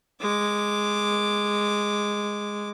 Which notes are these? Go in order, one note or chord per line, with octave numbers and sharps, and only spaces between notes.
G#3 D6